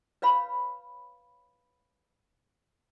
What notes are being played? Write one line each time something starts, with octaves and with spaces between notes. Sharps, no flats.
B4 C#5 F5 B5